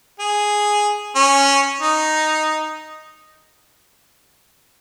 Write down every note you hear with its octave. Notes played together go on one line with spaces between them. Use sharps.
G#4
C#4
D#4